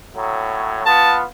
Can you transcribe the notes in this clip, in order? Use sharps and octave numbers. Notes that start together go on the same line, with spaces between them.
A2 F#3
B3 F4 A5